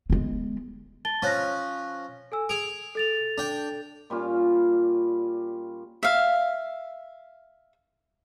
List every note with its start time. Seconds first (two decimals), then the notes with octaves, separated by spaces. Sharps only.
0.10 G#3 B3
1.05 A5 A6 G7
1.22 F3 C#4 C#6 F#6 A#6
2.32 A4 G#5 E6
2.49 G#4 D7 F7
2.95 A4 A6 F7
3.38 D4 G5
4.10 A#2 G3 C#4 F4
6.03 E5 F5